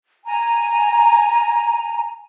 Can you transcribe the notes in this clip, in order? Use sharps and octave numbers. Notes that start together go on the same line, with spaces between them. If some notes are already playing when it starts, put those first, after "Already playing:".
G#5 A#5